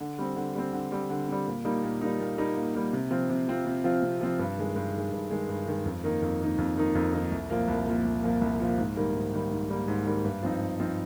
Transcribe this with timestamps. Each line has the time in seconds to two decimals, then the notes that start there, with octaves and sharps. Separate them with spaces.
0.01 D3
0.19 G3 C4
0.36 D3
0.55 G3 C4
0.73 D3
0.92 G3 C4
1.10 D3
1.28 G3 C4
1.46 A#2
1.65 G3 A#3 D#4
1.83 A#2
2.01 G3 A#3 D#4
2.20 A#2
2.38 G3 A#3 D#4
2.56 A#2
2.74 G3 A#3 D#4
2.93 C3
3.11 F3 C4 F4
3.30 C3
3.48 F3 C4 F4
3.66 C3
3.84 F3 C4 F4
4.03 C3
4.21 F3 C4 F4
4.39 G2
4.57 D#3 G#3
4.76 G2
4.94 D#3 G#3
5.12 G2
5.30 D#3 G#3
5.49 G2
5.67 D#3 G#3
5.85 F2
6.04 D#3 A#3 D#4
6.22 F2
6.41 D#3 A#3 D#4
6.58 F2
6.77 D#3 A#3 D#4
6.95 F2
7.13 D#3 A#3 D#4
7.32 C2
7.50 A#2 F3 A#3
7.68 C2
7.87 A#2 F3 A#3
8.05 C2
8.23 A#2 F3 A#3
8.41 C2
8.60 A#2 F3 A#3
8.78 G#2
8.96 D#3 G3 A#3
9.15 G#2
9.33 D#3 G3 A#3
9.51 G#2
9.69 D#3 G3 A#3
9.88 G#2
10.06 D#3 G3 A#3
10.24 G2
10.43 F3 C4 D#4
10.61 G2
10.80 F3 C4 D#4